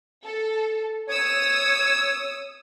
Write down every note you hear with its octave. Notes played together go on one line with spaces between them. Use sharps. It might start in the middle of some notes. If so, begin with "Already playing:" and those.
A4
C#5 D#6 E6